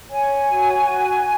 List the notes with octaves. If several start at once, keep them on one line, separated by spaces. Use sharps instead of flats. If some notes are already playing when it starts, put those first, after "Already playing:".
C#5 G#5
F#4